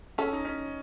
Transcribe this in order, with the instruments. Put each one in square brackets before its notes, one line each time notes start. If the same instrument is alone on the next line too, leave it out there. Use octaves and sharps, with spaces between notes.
[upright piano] C#4 [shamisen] A4
[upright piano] D#4
C#4